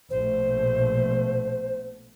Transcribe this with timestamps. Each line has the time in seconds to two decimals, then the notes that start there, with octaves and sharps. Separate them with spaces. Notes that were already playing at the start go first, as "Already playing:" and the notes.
0.10 A#1 B2 A3 C5